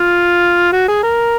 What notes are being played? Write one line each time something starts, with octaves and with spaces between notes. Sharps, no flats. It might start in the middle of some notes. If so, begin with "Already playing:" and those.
Already playing: F4
F#4
G#4
A#4